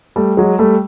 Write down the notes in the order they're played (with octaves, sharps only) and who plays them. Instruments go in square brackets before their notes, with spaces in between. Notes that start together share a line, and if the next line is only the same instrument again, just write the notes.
[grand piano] G3 A3
F#3 G#3
G3 A3